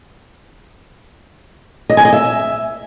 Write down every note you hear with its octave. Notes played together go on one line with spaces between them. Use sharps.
D#5
G#5
D#5
E5